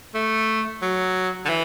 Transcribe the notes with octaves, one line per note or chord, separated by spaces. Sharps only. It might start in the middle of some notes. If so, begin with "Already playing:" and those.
A3
F#3
D3
E3